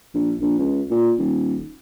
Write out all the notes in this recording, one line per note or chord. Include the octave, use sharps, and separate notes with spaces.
A#1
A#1
C#2
A#2
D#1